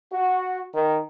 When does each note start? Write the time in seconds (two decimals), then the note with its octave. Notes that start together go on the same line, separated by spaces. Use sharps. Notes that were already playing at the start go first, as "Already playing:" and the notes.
0.13 F#4
0.75 D#3